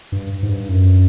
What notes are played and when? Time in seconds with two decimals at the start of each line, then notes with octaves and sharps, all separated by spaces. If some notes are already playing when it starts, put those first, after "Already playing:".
0.12 G2
0.43 G#2
0.50 G2
0.69 F#2